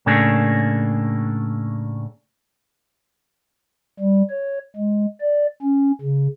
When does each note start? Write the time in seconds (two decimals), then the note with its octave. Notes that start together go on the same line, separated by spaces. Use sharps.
0.06 A2 C#3 A3 A#3 D4 G#4
3.99 G3
4.30 C#5
4.76 G#3
5.21 D5
5.62 C#4
6.01 C#3